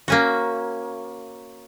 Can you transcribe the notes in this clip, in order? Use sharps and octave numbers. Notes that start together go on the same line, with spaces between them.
A#3 C#4 F#4